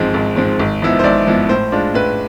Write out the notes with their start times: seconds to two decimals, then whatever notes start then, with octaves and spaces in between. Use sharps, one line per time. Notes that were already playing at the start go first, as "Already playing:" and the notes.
Already playing: G#1 G#2 F3 G#3 C4
0.14 G#1
0.36 G#2 F3 G#3 C4
0.60 G#1
0.82 G#2 F3 B3 E4
0.99 C5
1.04 G#1 D5
1.27 G#2 F3 B3 E4
1.49 A2 C5
1.72 G#3 D4 F4
1.94 A2 B4